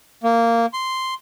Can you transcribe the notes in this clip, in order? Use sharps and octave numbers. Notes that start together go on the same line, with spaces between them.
A#3
C6